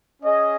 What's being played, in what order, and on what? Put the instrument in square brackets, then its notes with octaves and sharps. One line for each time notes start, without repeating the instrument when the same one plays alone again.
[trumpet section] C#4 G#4 D#5